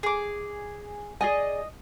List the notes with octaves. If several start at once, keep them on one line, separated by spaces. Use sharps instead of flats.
G#4 D6
G#4 D5 D#5 G#5